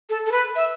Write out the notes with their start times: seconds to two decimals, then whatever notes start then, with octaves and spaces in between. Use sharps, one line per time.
0.10 A4
0.26 A4
0.32 B4
0.56 E5